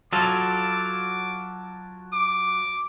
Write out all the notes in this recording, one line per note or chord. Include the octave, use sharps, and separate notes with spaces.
F#3 F4 A4 D6
D6